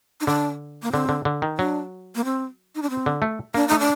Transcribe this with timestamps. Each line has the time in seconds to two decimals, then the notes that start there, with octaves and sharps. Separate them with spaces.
0.21 D#4
0.27 D3 D4
0.83 A#3
0.92 D3 C4
1.09 D3
1.25 D3
1.42 D#3
1.58 F#3 D4
2.15 A#3
2.25 C4
2.75 D#4
2.82 D4
2.90 C4
3.06 D3
3.22 A3
3.54 A#3 D4
3.68 A3 D#4
3.80 D4